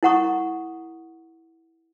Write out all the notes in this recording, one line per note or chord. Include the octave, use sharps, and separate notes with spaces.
E4 A#4 F#5 A#5 C#6 D#6